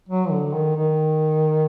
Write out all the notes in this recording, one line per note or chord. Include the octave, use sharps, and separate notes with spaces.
F#3
D3
D#3
D#3